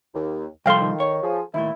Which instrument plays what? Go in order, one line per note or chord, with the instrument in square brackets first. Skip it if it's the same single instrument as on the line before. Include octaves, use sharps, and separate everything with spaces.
[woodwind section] D#2
[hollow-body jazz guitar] C2 F3 C6 [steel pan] A4 F5 G5 [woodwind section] C5
[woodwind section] D#3
[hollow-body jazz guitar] C#5
[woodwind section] F3 G#4
[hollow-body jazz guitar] D#2 A2 [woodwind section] E4